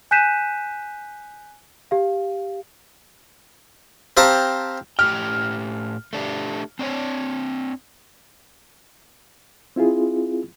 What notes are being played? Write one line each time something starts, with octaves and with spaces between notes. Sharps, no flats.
G#5 F#6 G6 B6 D#7 E7
G4 F5
C4 G4 C5 F5 A5 A#5
A2 G4 G5 F6
A3 D4 G4
C4 D4 C#5
C4 E4 F4 G#4